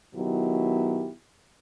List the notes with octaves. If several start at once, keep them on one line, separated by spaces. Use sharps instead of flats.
B2 D#3 F#3 E4 G4